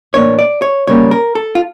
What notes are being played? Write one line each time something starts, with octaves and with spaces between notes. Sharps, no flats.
A2 E3 A#3 D4 C#5
D5
C#5
C#3 G3 A#3 C#5
A#4
A4
F4